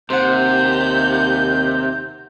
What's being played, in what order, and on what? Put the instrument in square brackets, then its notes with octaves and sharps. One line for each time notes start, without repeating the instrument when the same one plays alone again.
[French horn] D#2 [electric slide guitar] C3 [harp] C5 F#5 [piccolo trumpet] G6